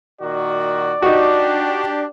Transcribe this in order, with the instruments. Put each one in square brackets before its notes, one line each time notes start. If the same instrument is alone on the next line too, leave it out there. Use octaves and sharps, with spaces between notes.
[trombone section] A#2 D#3 F#4 [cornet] D5
[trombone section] D4 G4 [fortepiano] D#4 F#4